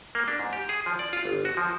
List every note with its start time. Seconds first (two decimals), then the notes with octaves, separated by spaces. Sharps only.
0.15 A#3
0.28 D4
0.40 G#2
0.53 G4
0.69 G#4
0.86 F3
0.99 D5
1.13 F4
1.25 G1
1.45 F#4
1.57 F3